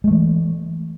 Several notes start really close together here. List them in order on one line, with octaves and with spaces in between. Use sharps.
G#3 A3 E3